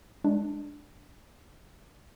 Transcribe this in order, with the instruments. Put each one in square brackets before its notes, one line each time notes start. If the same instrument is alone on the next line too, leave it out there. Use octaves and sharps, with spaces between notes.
[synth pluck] G#3 D4